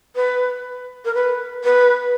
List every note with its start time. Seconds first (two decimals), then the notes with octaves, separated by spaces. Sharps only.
0.16 B4
1.05 A#4
1.14 B4
1.64 B4